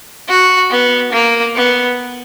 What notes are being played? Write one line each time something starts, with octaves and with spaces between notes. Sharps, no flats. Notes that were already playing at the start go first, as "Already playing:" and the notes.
F#4
B3
A#3
B3